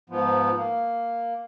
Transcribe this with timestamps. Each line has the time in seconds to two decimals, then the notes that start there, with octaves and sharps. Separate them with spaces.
0.10 G#2 F3 B3
0.56 A#3